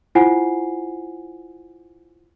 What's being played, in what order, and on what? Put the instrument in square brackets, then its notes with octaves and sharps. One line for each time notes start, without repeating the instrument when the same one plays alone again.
[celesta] E4 F4 C5 F#5 G#5 C7